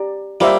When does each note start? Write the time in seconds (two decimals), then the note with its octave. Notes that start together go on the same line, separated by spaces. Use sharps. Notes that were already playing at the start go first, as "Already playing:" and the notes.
Already playing: G4 D5 A#5
0.40 G3 A#3 F4 C5 E5